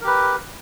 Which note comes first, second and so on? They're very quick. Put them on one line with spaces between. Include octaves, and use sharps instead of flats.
A#4 G4 B4